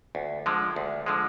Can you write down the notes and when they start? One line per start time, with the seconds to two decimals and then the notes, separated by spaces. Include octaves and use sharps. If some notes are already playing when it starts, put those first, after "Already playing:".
0.15 D2
0.46 D3 F3 G#3
0.76 D2
1.06 D3 F3 G#3